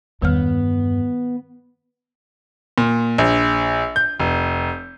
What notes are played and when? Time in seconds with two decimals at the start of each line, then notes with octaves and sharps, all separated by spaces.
0.22 E2 G2 D#3 G3 B3 F6
2.78 A#2
3.18 A#1
3.96 G6
4.20 F1